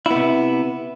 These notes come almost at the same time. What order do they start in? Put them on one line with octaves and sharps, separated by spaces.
E4 B3 C3